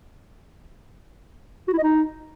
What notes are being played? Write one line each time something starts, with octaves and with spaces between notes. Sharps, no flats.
F#4
E4
D#5
D#4